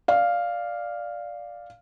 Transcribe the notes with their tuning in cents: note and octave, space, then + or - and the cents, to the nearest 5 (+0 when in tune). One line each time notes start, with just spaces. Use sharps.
D5 +0 F5 +0